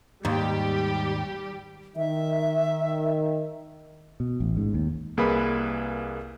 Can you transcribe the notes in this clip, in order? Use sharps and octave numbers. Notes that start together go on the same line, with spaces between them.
D#2 G#2 G3 G4
D#3 E5
B2
A1
G#2
D#2
C2 A#3 G#4 B4 B5